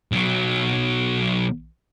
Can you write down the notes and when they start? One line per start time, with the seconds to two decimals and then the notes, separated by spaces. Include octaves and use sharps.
0.12 B1 F#3